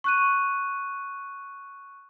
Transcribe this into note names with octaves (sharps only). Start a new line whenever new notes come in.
C#6 F#6 D#7